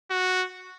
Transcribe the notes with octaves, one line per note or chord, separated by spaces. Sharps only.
F#4